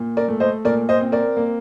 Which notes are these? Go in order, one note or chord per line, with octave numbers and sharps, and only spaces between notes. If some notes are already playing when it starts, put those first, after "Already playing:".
Already playing: A#2
A#4 D5
A3
C5 D#5
A#2 A#4 D5
C5 D#5
C4
A#4 D5
A#3